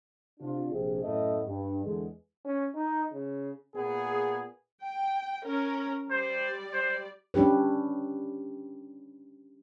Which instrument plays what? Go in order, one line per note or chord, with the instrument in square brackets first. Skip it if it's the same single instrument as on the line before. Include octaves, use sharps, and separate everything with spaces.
[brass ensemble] C3 D4 F4
A#1 C3 G#4
F#2 A2 A3 B3 D#5
G2
E2 D3 G#3
[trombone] C#4
D#4
C#3
[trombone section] A#2 B3 G#4
[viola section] G5
C#4 A#4
[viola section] G3 D5 [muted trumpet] C5
[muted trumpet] C5
[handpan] G3 C#4 D4 G4 B4